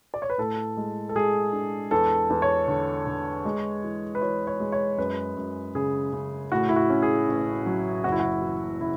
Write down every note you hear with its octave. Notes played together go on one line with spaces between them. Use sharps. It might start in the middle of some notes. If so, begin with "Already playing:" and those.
D5
C#5
B4
A2 A4
G#3
A4
G#3 G#4
D4
E2 A4
E2
C#5
D3
D3
G#3
E3
B4
E3 C#5
C#5
G#3
C#5
F#2 B4
F#2
C#3 G#4
C#3
A2 F#4
E4
F#4
C#4
G#4
A1
F#3
F#1 F#4
E4
F#4
E3
C#3 E4